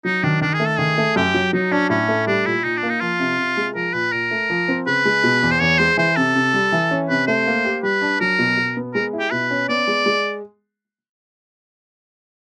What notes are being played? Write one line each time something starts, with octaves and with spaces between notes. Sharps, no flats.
F#3 D#4
D#3 D4
D#3 D4
G#4
A3
A4
D#3 G#4
A3
F#2 G4
F#3
F#3 D#4
C#4 D4
A2 C#4
A3
G3 D4
A#2 E4
A#2 D#4
D4
A#3
D#4
F3 F4
C3
C3
G#3
F3 A#4
A#2 B4
A#2 A#4
A3
F3
C4
C#3 B4
G#3
B2
E2
C5
E2 C#5
G#3 C5
E3 C5
C3 A4
C3
G3
E3
C#4
C3 B4
A3 C5
A#3
G4
G3 B4
D4
F#3 A#4
B2
B2
B3
G#3 A#4
E4
G4
B2 B4
C#4
B3 D5
G#3
G#3